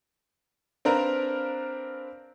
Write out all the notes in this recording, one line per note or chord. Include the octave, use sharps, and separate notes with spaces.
C4 D4 A#4 B4 F5 A#5